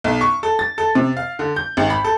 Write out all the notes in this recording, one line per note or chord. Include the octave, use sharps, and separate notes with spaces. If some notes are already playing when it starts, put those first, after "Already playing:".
B1
C#6
A4
A6
A4
C3
F5
D3
G6
G#1
B5
A4